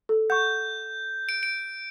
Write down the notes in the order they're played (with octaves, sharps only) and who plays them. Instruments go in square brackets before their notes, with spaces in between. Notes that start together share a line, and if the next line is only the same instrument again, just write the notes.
[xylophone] A4
[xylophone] F#5 C#6 [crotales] G6
[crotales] D7
D7